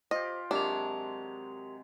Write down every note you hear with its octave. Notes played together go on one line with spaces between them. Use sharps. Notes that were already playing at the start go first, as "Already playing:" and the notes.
F4 G4 C5 D#5
C3 F#3 G#3 D4 G4 A#4 F7